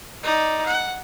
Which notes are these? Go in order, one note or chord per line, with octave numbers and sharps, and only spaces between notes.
D#4 D5
F#5